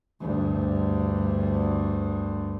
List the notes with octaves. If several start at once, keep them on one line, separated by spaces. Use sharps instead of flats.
D2 G2